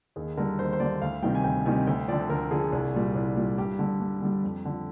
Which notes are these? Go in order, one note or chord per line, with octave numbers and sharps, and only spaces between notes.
D#2 G#4
D3 G3 A#4
D#2 C5
C5
D3 G3 D5
D2 F5
C3 D#3 G3 G5
G#5
D2 G5
C3 D#3 G3 G#5
D2 G5
D3 F3 D5
D2 A#4
D3 F3 G#4
C2
A#2 G3
C2
A#2 G3
G2 G4
D3 G3
G2
D3 G3
F2
D3 F3